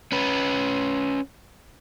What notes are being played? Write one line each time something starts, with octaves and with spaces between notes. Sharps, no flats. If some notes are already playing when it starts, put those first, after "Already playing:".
C#4 B4